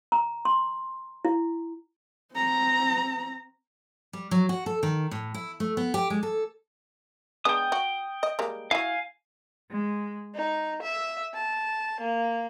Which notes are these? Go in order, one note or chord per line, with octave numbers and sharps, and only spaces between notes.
A#5
C6
E4
C4 A#5
G3
F#3
F#4
A4
D#3
A2
E4
A3
B3
G4
G#3
A4
G#3 B3 D4 G5 D#6
F#4
D#5
G3 G#3 A#3
E4 F#4 F5 G#5
G#3
D#4
E5
A5
A#3